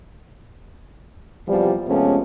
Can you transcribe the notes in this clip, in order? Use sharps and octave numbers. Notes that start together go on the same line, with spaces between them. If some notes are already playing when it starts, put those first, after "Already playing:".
E2 C3 F3 G3
C3 F3 G#3 A3 B3 C#4